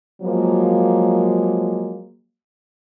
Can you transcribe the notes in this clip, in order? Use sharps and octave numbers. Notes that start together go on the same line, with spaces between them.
F3 F#3 G#3 A#3